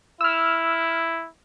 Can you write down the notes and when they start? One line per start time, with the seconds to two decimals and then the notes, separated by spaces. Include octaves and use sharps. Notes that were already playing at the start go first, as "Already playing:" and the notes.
0.21 E4 E6 F6